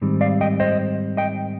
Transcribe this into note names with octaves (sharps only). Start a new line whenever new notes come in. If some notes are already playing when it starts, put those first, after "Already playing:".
G#2 D#3 G3 C4
D5 F5
D#5 G5
C5 D#5
D#5 G5